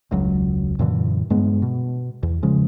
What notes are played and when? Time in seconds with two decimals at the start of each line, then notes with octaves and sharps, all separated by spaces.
0.11 E1 C#2 F#3
0.79 F#2 A#2 D3 E3
1.30 G2 G#3 B3
1.62 B2
2.23 E2
2.43 C#3 F3 G#3